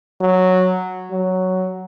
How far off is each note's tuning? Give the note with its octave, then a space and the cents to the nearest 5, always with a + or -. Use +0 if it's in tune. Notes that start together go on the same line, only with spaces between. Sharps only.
F#3 -5
F#3 +5